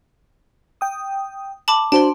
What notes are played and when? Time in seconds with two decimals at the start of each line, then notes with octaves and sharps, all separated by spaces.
0.81 G5 D#6
1.68 A5 B5 D6
1.92 D4 F#4 C5 A5 C6